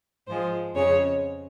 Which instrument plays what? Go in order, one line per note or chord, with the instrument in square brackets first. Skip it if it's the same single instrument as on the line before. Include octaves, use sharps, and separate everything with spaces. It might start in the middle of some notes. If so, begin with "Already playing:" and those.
[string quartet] G#2 F3 G#3 C5
F2 C#3 G#3 C#5